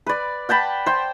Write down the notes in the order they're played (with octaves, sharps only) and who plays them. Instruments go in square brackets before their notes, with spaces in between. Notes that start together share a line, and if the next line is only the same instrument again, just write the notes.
[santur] B4 D5
F#5 G5 A5 B5
C5 G5